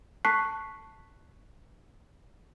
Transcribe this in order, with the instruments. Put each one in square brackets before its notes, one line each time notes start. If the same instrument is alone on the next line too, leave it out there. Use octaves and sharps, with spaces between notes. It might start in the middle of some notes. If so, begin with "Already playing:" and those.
[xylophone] A5 C#6 F#6 B6 C7